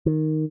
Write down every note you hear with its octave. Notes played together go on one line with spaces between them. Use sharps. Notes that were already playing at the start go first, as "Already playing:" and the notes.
D#3